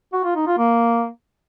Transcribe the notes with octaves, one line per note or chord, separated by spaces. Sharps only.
F#4
F4
D#4
F4
A#3